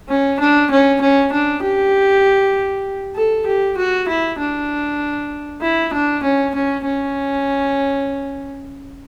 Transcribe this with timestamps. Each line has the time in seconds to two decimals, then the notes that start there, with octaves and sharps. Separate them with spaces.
0.09 C#4
0.40 D4
0.70 C#4
1.01 C#4
1.32 D4
1.62 G4
3.15 A4
3.46 G4
3.77 F#4
4.08 E4
4.38 D4
5.61 E4
5.93 D4
6.23 C#4
6.55 C#4
6.85 C#4